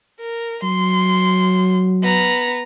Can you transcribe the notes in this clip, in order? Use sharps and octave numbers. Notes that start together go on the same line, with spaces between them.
A#4
F#3 C6
B3 A#5